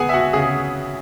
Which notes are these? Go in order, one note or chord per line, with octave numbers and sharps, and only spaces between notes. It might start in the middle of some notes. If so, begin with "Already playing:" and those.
Already playing: B3 G#4 F#5 G#5
E5
F#4 F#5
C#3 G#4